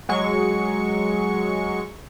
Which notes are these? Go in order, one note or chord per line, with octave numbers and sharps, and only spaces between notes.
F#3 G#3 C#6